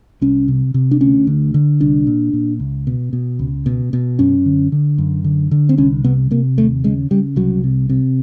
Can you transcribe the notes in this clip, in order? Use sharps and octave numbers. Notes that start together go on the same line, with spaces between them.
C2 C#4
C3
C3
D4
D2 C#4
D3
D3
C2 D4
A#2
A#2
C#2
B2
B2
C#2
B2
B2
F#2 C#4
D3
D3
F#2
D3
D3
C4
C2 C#4
C3 B3
C3 A#3
D#2 A3
C#3 G#3
C#3 G3
C2 F#3
C3
C3